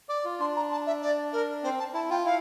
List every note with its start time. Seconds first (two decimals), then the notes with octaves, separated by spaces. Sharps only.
0.08 D5 D6
0.25 F4
0.40 D4 C6
0.56 A#5
0.71 A5
0.86 E5
1.02 D5
1.32 A#4
1.63 C4 C5
1.79 A5
1.94 E4 A5
2.10 F4 G5
2.25 E4 F5